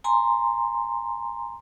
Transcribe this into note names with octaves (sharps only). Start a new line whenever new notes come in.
G#5 A#5 C6